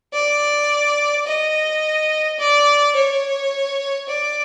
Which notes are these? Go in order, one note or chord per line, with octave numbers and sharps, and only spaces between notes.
D5
D#5
D5
C#5
D5